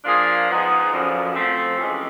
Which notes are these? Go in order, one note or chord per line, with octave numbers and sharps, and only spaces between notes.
F3 A#3 D4 F4 G#4
F3 G#3 B3 D#4 G#4
F#2 D3 F3
F3 A3 C4
F2 C3 E3 G#3 C#4